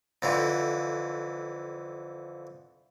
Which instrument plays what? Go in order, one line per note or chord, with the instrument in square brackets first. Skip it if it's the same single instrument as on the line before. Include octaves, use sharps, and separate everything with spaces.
[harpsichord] F2 D3 E3 F3